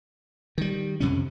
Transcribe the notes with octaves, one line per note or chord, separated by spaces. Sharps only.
D#3 G3
F2 C3 C#4